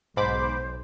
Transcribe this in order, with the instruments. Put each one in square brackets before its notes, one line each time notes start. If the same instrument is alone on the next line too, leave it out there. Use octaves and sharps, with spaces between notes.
[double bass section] B1 [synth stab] G#2 B5 D6 [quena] C5